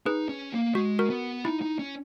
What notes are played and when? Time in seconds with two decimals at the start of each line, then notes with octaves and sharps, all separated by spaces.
0.06 D#4 G#4 B4
0.29 C#4
0.52 A#3
0.75 G#3 F#4
0.99 F#4 A#4
1.10 B3
1.45 D#4 E4
1.62 D#4
1.79 C#4